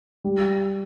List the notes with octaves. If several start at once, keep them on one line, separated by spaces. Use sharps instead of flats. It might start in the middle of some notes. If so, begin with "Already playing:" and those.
G3